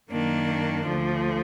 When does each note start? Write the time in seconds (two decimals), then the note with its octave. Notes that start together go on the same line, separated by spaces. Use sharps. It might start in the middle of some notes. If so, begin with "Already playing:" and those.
0.10 F#2 D#3 A#3 D4
0.86 D2 D3 F3